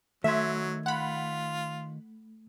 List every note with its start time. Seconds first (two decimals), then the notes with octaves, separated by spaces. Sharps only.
0.24 D#3 F#3 A3 E5 C6 G#6
0.86 F4 F#5 B5